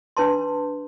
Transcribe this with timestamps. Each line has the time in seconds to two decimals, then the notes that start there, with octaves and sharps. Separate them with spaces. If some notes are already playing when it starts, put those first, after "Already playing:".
0.17 D4 B4 A5 C6